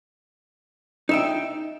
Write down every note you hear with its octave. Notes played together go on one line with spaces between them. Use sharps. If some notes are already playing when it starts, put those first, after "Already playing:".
D#4 E5 G5